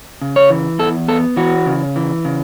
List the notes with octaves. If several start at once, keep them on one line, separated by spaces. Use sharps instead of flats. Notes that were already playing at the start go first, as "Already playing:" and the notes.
C#3
C#5
E3
E2 A4
B3 A4
E3 F#4
C#3
E3
C#3